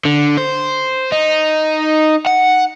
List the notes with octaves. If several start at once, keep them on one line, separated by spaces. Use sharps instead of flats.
D3
C5
D#4
F#5